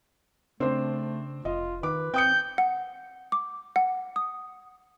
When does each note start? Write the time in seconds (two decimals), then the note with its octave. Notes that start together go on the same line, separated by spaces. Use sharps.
0.60 C#3 A3 C4 D4 C5
1.45 F1 F4 D#5
1.83 D#3 B4 D6
2.14 C4 G5 D#6 G6 C#7
2.58 F#5
3.32 D6
3.76 F#5
4.16 D#6